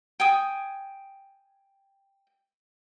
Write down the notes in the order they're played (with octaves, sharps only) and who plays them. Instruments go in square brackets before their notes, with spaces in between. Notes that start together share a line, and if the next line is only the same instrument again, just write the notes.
[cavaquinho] G5 G#5 D#6